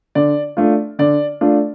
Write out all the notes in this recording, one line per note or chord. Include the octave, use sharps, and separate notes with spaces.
D3 D5
A3 D4 F4
D3 D5
A3 D4 F4